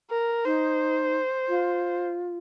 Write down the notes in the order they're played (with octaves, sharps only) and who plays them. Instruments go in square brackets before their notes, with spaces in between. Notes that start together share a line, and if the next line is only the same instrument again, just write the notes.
[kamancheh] A#4
[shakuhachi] D#4 [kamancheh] C5
[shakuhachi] F4